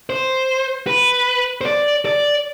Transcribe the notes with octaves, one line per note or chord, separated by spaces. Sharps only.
C5
B4
C5
D5
D5